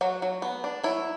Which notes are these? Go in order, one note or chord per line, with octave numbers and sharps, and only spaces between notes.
F#3 F#4
F#3
B3
D4
F#3 E4